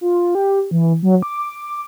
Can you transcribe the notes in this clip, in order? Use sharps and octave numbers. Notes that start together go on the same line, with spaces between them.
F4
G4
E3
F#3
D6